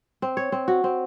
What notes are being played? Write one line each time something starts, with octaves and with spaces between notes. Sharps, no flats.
C4
C#5
C4
F#4
C4